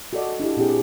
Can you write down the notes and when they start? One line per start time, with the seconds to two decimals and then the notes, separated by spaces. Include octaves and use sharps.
0.13 F#4 A4 D5 D#5
0.40 D4 E4 G4
0.57 A#2 C4 E4 G4 G#4